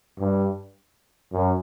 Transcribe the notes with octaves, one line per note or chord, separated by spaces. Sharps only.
G2
F#2